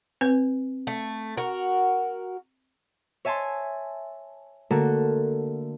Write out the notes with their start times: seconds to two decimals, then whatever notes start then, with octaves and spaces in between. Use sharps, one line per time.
0.21 C4 B4
0.87 A3
1.37 F#4 A#4
3.25 C#5 E5 G#5 A5 C6
4.71 D3 A3 A#3 F#4 A4